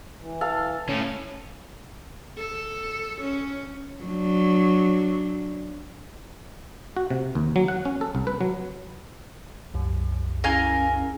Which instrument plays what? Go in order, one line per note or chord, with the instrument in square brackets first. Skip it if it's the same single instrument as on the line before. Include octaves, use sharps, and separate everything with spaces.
[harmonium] E3
[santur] A4 F5
[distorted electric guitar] A2 [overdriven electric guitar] C#4
[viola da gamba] A4
C#4
F#3 D4
[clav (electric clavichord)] F#4
C3
D#2
F#3
F#5
C#4
A4
C2
B4
F#3
[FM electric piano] C2 F#2
[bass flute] C#4 [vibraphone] E4 G#4 [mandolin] A#4 F5 G#5